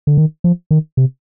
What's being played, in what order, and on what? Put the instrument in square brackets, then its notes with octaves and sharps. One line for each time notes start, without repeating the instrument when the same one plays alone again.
[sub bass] D3
D#3
F3
D#3
C3